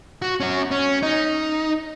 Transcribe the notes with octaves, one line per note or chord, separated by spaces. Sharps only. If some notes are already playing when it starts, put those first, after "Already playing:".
F#4
C#4 F#4
C#4
D#4